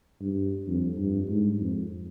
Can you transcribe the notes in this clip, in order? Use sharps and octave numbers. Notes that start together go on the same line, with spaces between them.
G2
F2
G2
G#2
F2